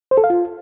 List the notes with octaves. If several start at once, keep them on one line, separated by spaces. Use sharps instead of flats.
C5
A4
F5
F4